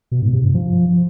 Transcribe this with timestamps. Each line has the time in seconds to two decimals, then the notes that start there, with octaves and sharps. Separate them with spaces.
0.11 B2
0.22 G#2
0.33 C3
0.44 G2
0.54 F3